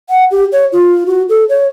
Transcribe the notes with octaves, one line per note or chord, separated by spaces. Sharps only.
F#5
G4
C#5
F4
F#4
A4
C#5